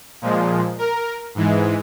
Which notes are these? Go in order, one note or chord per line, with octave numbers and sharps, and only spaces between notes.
A#2 F3 G#3
A#4
G#2 E3 G#3